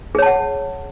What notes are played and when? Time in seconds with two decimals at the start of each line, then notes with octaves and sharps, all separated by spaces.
0.15 G#4
0.19 C#5
0.22 A5
0.26 F#5